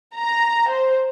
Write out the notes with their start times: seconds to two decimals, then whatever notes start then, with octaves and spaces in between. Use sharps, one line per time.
0.16 A#5
0.69 C5